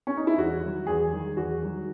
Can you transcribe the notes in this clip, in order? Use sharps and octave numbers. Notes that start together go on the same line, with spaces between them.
C#4
D#4
E4
E2 F#4
D#3 F#3
E2 G#4
D#3 F#3
E2 F#4
D#3 F#3